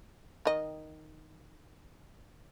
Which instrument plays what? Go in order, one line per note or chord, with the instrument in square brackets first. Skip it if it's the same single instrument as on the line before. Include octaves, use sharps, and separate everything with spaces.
[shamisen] D#3 D#5